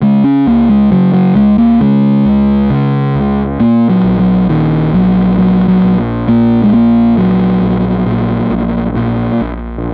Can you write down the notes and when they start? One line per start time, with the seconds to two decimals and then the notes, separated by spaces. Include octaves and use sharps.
0.02 C#3 G#3
0.24 C#4
0.47 C#2 A#3
0.69 G#3
0.91 C#3 F#3
1.14 F#3
1.36 C#2 G#3
1.58 A#3
1.80 C#3 G#3
2.25 C#2
2.70 C#3
3.15 C#2
3.60 A#2 A#3
3.90 F#3
4.04 A#1
4.19 F#3
4.49 A#2 D#3
4.93 A#1 F#3
5.38 A#2 F#3
5.68 F#3
5.84 A#1
6.28 A#2 A#3
6.64 G#3
6.73 A#1 A#3
7.17 A#2 F#3
7.62 A#1
8.07 A#2
8.51 A#1
8.96 A#2
9.41 A#1